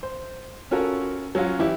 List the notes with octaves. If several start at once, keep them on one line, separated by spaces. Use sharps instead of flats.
C5
C#4 F4 F#4 A4 A#4
F#3 C#4 F4 F#4
E3 E4 G4